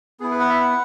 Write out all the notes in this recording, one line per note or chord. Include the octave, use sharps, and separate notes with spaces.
B3 E4 G#4
B4
F#5
E5
F#5